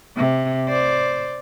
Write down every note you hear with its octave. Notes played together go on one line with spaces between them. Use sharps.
C3
C5 D5